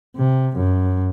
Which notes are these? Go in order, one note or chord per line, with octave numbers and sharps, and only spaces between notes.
C3
F#2